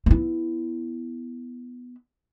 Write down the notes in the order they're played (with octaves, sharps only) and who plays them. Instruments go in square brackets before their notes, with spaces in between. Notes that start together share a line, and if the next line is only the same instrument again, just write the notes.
[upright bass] B3 E4